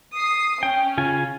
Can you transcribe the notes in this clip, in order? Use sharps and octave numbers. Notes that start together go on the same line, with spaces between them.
D#6 C7
C#4 G5
C#3 F4 G#5